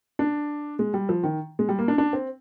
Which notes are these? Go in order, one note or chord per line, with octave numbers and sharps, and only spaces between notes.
D4
G#3
G3
F3
D#3
G#3
G3
A#3
D4
D4
C4